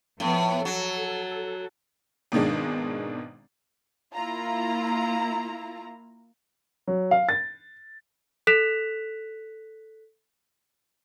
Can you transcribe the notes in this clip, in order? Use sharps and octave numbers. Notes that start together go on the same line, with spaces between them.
A2 F3 B3
F#3 A4
G#1 B2 D#3 G#3 D4
A#3 E4 F4 A#5
F#3
F5
A6
A4 F#6 B6 E7 F7